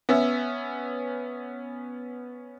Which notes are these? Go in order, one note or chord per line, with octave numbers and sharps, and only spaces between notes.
B3 C#4 E5